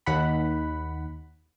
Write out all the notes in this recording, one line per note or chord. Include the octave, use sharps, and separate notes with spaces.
D#2 F#5 B5